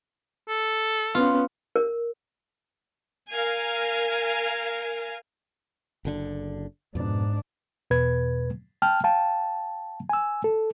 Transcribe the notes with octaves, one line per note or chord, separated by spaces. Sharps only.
A4
B3 C#4 F4
A#4
A#4 F5 G#5
F#1 D3 D4
F2 G#2 B2 D4
E2 B2 B4 G#6
G5 A5 F6
F5 G5 A5
G#5 E6
A4